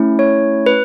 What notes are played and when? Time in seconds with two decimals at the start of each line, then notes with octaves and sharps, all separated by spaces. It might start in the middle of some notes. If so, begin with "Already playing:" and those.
Already playing: A3 C#4 E4
0.19 C#5
0.66 B4